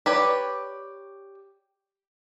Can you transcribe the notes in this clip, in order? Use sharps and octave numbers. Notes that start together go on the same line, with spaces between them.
G4 B4 C#5 D5